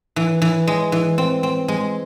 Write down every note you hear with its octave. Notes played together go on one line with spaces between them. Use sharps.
E3
E3
G#3
E3
C4
C4
G#3